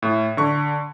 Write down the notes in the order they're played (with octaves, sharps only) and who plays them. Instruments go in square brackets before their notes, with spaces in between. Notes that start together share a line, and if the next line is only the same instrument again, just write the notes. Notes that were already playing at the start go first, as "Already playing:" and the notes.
[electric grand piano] A2
D3 C#6